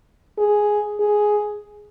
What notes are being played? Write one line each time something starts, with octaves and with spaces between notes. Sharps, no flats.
G#4
G#4